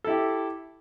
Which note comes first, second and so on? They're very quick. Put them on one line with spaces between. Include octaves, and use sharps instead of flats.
A4 E4 G4